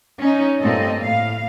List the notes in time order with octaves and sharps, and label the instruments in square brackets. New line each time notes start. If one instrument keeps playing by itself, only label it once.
[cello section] C#4 D#4
G2 A#2 A3 C4 A4 D#5
A2 F5